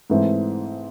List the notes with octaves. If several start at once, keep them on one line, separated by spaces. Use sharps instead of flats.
G#2 E3 A3 C4